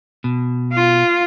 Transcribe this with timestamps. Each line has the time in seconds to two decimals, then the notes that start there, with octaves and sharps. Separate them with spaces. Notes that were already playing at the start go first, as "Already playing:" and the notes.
0.24 B2
0.73 F4